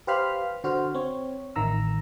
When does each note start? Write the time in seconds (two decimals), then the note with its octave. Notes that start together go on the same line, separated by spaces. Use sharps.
0.07 G4 B4 C5 F5 B5 F6
0.64 D3 F#4 C5 F6
0.94 C4 C#5
1.56 A1 D#3 A#5 E6